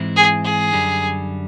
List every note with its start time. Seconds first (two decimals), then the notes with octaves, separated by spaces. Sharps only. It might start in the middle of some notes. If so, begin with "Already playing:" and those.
Already playing: G#2 E3 G#3 C4 E4
0.16 G#4
0.45 G#4
0.73 F#2 D3 G3